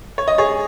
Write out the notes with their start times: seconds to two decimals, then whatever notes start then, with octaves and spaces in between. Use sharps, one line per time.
0.18 C#5
0.28 D#5
0.38 G#4 C#5